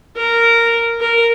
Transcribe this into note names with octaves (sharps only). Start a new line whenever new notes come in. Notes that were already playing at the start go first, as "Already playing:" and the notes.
A#4
A#4